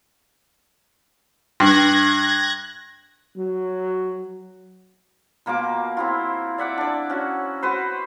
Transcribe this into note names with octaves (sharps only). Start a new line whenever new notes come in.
G2 F#6 G#6 A#6
F#3
B2 A#3 F4 D6
C4 E4 F4
D5 E5 F#5 D6
D4 D6
C#4 F#4
F#4 B4 C5